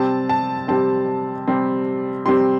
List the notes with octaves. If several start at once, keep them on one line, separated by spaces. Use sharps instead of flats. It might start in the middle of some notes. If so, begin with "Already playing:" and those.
Already playing: C3 G3 C4 A5
A5
C3 G3 C4 A5
C3 G3 C4
C3 G3 C4 C6